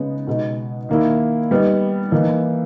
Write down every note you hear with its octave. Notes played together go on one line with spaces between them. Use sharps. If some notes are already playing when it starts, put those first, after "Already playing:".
Already playing: C#3 G#3 B3 D#4
B2 G#3 D#4
D#3 A#3 E4
G3 B3 D#4
E3 A#3 D#4